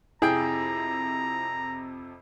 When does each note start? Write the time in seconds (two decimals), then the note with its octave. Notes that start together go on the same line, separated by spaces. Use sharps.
0.22 F2 C3 E4 G#4 G5 A#5